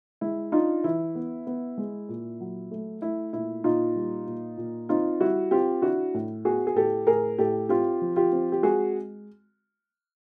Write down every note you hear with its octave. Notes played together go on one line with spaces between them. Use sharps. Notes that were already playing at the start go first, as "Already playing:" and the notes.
G#3 E4
D4 D#4 F4
E3 E4
B3
B3
G#3
A#2
F#3
A3
A3 E4
A#2 E4
A#2 D#4 F4
G3
A#2
A#2
C4 D#4 F4
G3 E4 F#4
C4 F4 G4
D4 E4 F#4
A2
B3 F#4 G#4
G#4
A2 G4 A4
A2 G#4 A#4
A2 G4 A4
C4 F4 G4
F3
F4 G4
C4
G4
G#3 F#4 G#4